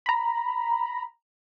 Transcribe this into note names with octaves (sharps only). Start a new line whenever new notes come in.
A#5 B5